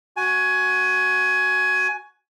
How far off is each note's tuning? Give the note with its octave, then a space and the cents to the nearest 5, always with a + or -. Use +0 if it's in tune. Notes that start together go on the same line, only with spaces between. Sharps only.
F#4 +0 G#5 +20